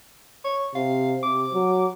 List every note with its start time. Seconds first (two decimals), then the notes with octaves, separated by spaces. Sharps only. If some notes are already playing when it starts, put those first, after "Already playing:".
0.45 C#5
0.75 C3 F5
1.23 C3 D6
1.53 F#3